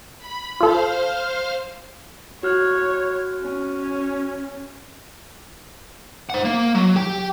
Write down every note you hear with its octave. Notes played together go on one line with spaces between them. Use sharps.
B5
F4 A4 C5 F5 F6
F#4 C#5 F6 F#6
C#4
C5 F#5
A#3
F#3
G4 G5